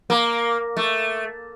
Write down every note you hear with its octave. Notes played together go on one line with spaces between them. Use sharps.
A#3
A3